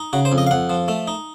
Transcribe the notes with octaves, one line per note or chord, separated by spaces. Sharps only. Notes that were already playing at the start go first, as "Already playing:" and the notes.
Already playing: D#4
C#3 F#4
C5
F2
D#5
F5
F2 F#5
F3
A3
D#4